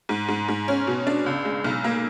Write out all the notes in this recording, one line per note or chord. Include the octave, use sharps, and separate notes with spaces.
G#2
G#2
G#2
C#4
B2
D4
C#2
G#3
B1
A#3